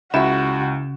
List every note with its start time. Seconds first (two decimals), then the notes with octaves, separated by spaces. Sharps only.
0.14 C#2 C#3 E4 F#4 E5 E7